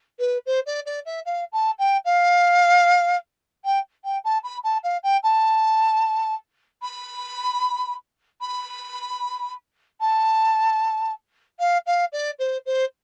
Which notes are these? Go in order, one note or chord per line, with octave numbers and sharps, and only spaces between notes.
B4
C5
D5
D5
E5
F5
A5
G5
F5
G5
G5
A5
B5
A5
F5
G5
A5
B5
B5
A5
F5
F5
D5
C5
C5